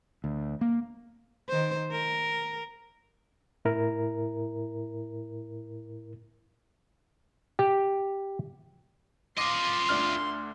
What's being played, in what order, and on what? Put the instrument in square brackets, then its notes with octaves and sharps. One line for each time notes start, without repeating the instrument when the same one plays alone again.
[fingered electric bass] D2
A#3
[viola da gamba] D#3 C5
A#4
[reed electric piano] A2 E4 A#4
[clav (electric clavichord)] G4
[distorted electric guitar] F4 D#5 [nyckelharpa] C6 [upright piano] D6 A#6 C7
[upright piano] D2 D4 F6